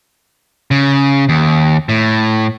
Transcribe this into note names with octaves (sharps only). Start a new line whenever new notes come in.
C#3
D#2
A2